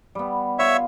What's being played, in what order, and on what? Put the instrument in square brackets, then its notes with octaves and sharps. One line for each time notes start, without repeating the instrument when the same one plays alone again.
[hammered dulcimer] G3 B3
[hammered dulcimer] F4 [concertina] C#5 E5